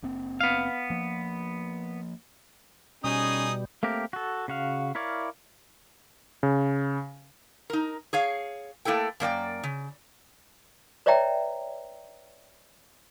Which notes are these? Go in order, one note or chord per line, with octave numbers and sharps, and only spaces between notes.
F#1 A#3 C4
B3 F5
F3 A#3
B2 G3 C#4 D#4 G#4 D#6
A3 A#3 C4 G4 A#4
F#4 A4
C#3 F#4 F5
E4 A#4 C#5 D5 F5
C#3
D#4 A#4
G#4 C#5 F5
A3 A#3 E4 A4 G5
F#2 A#3 D5 G5
C#3
B4 C#5 D5 E5 G5 A#5